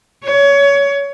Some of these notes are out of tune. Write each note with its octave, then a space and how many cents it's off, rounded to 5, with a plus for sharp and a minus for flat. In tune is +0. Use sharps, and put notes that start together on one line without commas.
C#5 +25